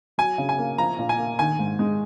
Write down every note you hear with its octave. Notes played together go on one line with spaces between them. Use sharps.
F#3 G#5
C#3
G#5
A#3
F3 A#5
A#2
G#5
A#3
D#3 G#5
G#2
G#3